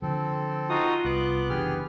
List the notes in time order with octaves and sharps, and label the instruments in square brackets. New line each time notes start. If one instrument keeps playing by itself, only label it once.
[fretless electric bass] D3 F3 [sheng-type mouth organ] C4 A4
[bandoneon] D#4 F#4 D#6 [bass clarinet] F4
[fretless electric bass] C2 [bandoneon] B3 [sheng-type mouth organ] D6 F#6
[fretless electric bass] F#1 E3 D4 [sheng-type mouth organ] G4 G#4 F6